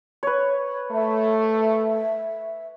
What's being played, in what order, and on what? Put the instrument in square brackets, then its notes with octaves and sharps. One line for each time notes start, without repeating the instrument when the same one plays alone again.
[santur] B4 C#5
[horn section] A3 [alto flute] E5